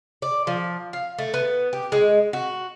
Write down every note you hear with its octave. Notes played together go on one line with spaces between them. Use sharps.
D5
F3
F5
A3
B3
G4
G#3
F#4